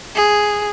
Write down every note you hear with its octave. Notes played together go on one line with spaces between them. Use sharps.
G#4